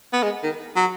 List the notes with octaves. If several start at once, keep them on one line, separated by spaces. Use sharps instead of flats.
B3
G#3
D#3
F#3